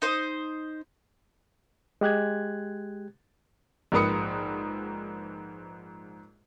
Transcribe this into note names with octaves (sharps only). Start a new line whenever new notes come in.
D#4 C5 C6
G#3 G4 F#6 G#6
A#1 G#2 A#4 B4 D#6 C#7